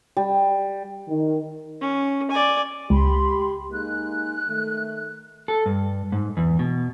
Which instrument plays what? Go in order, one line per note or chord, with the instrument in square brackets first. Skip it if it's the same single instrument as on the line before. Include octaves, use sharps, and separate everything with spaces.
[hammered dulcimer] G3
[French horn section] D#3
[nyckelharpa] C#4
D5 G#5
[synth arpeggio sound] C#2 [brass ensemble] G4 [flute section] B5 C6
[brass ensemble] G#3 A#3 D#4 [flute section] F#6
[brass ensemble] D#3 A3
[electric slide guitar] A4
G2
G#2
E2
B2